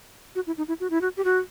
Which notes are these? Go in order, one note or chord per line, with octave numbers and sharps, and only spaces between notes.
F#4
E4
D#4
E4
F#4
E4
F#4
G4
F#4